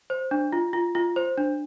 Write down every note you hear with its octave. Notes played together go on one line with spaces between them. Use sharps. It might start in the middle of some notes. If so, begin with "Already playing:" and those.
C5
D4
F4
F4
F4
C5
D4